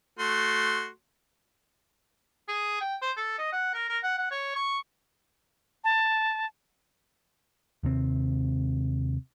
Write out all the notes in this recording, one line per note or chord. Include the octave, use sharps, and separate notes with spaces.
A3 F#4 C6
G#4
G5
C5
A4
D#5
F#5
A#4
A#4
F#5
F#5
C#5
C#6
A5
D#2 C3 C4